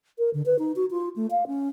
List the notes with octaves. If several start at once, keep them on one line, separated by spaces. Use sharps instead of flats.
A#4
D3
B4
D#4
F#4
F4
A3
F5
C#4